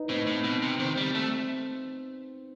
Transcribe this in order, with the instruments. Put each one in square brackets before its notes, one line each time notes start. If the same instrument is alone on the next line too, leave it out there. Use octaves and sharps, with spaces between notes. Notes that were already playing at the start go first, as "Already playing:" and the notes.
Already playing: [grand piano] D#4 B4
[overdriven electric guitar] A2 [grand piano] C4
[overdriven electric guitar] A2
B2
C3
[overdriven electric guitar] D#3 [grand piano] C4
[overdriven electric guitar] G3
A3